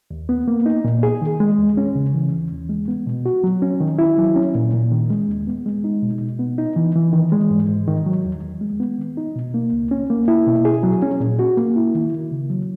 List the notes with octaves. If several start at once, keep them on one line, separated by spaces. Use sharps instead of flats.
D#2
B3
A#3
D#4
A#2
G#4
D#3
G#3
E2
C#4
C#3
E3
D#2
D#2
G#3
B3
B2
F#4
F#3
C#4
D#3
E4
F#3
C#4
A#2
A#2
D#3
G#3
D#2
B3
G#3
D#4
B2
B2
B3
D#4
E3
E3
D#3
G#3
G#2
G#2
D#3
F#3
E2
E2
G#3
B3
D#3
D#4
B2
A#3
C#2
C#4
A#3
E4
B2
G#4
F#3
C#4
A#2
F#4
A#3
E4
D#3
D#3
C#3
F#3